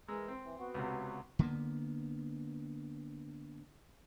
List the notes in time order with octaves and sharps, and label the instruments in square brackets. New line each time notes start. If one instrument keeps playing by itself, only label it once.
[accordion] E3 A#4 E6 [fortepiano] G#3
[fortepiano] C4
[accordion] E3
B3 F#4
[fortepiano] C#2 C3
[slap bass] D3 A#3 B3